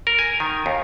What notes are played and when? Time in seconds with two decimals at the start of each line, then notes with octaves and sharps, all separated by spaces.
0.07 A#4
0.19 G#5
0.40 D#3
0.66 D#2